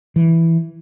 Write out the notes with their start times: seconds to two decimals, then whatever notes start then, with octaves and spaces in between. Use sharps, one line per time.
0.16 E3